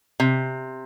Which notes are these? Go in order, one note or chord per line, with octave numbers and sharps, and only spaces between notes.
C3